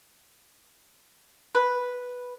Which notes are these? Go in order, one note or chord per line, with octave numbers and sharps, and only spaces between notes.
B4